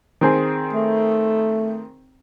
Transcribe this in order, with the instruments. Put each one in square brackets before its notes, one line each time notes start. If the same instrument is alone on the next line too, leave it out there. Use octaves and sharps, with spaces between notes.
[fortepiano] D#3 C4 G#4
[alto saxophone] A3